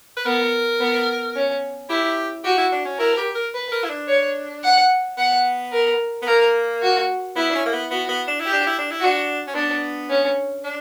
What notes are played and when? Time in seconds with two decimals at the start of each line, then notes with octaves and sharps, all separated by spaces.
0.17 B4
0.25 B3 A#4
0.80 B3
1.35 C#4
1.89 E4 G4
2.44 F#4 G4
2.58 E4
2.72 D4
2.85 C#4
2.99 E4 A#4
3.17 G4
3.35 A#4
3.54 B4
3.72 A#4
3.84 E4
3.90 D4
4.08 C#5
4.63 F#5
5.18 B3 F#5
5.73 A#4
6.22 B3
6.27 A#3 A#4
6.82 F#4
7.36 B3 E4
7.50 D4
7.55 C#4
7.66 A#3
7.73 B3
7.91 B3 F#4
8.09 B3
8.28 D4
8.40 E4
8.46 G4
8.53 D4
8.67 E4
8.78 D4
8.91 E4
9.00 F#4
9.05 D4
9.47 C#4
9.55 B3 D4
10.10 C#4
10.64 D4